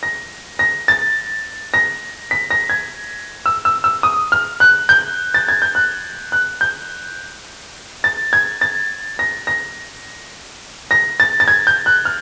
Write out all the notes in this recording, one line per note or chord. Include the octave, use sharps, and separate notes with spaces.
A#6
A#6
A6
A#6
B6
A#6
G#6
E6
E6
E6
D#6
F6
F#6
G6
A6
G#6
G6
F#6
F#6
G6
A6
G#6
A6
A#6
A#6
A#6
A6
A6
G#6
G6
F#6
F6